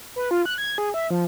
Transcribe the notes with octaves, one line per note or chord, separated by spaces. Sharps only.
B4
F4
F#6
G#6
G#4
E5
F3